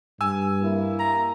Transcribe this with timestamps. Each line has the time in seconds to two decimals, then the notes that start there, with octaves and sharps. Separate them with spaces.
0.21 G2 G#5 E6
0.61 A#3 E4
1.00 A#5